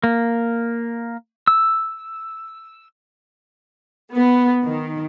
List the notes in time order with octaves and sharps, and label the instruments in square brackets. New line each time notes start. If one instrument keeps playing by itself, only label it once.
[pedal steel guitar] A#3
E6
[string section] B3
D#3